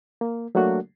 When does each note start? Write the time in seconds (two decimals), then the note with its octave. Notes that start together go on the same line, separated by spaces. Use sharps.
0.21 A#3
0.55 F#3 A3 A#3 D4 F#4